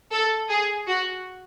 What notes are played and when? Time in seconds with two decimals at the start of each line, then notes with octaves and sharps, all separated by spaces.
0.12 A4
0.50 G#4
0.87 F#4